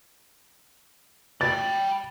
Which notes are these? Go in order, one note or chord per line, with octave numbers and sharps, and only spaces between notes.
G5 B5 A6